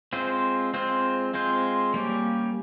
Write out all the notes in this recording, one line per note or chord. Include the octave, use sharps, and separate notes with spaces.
G#3 C4 F4 C5
G#3 C4 F4 C5
G#3 C4 F4 C5
G3 A#3 C#4 G4